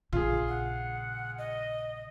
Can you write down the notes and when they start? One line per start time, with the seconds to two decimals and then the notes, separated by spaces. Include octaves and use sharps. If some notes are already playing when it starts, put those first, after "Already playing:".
0.13 A#1 C#3 F4 G#4
0.48 F#5
1.38 D#5